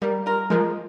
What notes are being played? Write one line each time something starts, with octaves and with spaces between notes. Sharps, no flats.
G3 A#3
F4 A#4
F3 G#3 A#3